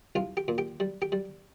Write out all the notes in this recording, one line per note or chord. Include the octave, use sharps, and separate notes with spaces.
C2 F4
G4
A#2
G4
G3
G4
G3